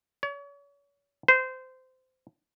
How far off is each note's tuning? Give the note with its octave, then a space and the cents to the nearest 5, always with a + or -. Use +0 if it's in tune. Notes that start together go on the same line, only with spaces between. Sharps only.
C#5 +40
C5 -20